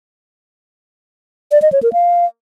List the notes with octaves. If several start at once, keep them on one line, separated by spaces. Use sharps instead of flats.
D5
D#5
C#5
A#4
F5